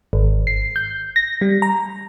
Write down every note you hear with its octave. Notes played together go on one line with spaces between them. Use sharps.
G#1
C7
G6
A#6
G3
A#5